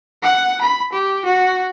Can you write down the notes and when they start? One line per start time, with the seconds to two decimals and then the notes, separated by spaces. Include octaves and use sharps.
0.23 F#5
0.61 B5
0.92 G4
1.25 F#4